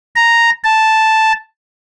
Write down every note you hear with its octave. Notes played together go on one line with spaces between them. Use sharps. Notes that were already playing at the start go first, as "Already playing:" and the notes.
A#5
A5